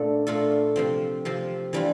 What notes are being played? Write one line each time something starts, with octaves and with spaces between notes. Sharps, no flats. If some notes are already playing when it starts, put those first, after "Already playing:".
Already playing: A#2 A3 D4 F4 A4
A#2 A3 D4 F4 A4
C3 F3 C4
C3 F3 C4
E3 G3 D4 F4